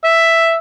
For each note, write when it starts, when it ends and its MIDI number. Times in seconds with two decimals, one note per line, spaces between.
0.04 0.57 76